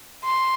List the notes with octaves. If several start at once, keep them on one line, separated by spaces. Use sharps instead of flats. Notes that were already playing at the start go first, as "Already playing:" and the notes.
C6